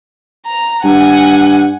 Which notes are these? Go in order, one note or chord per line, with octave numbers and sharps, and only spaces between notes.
A#5
G2 F#5 G#5